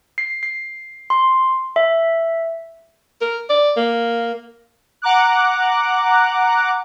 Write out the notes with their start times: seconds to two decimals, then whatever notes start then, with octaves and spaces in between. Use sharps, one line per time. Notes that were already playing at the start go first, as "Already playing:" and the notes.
0.18 C7
0.43 C7
1.10 C6
1.76 E5
3.22 A#4
3.50 D5
3.77 A#3
5.02 F#5 A#5 D6 F#6